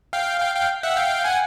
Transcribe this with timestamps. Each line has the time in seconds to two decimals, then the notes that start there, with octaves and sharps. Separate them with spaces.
0.13 F5 G5
0.40 F5 G5
0.55 F5 G5
0.83 E5 F#5
0.96 F5 G5
1.24 F#5 G#5